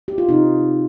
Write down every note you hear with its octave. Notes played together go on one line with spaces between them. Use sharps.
G4
F4
C3 C4 D#4